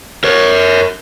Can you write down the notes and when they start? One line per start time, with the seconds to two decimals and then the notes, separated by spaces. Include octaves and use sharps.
0.24 A#4 C#5